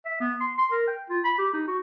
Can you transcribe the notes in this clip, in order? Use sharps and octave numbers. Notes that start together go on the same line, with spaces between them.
E5
B3
C6
C6
A#4
G5
F4
B5
G4
D#4
F#4